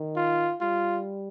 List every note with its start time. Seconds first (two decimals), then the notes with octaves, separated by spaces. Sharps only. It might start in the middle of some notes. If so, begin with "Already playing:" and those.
Already playing: D#3
0.16 F4
0.61 G3 F4